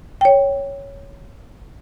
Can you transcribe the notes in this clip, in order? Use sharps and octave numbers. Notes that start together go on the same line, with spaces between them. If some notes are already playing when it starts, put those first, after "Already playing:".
C#5 G5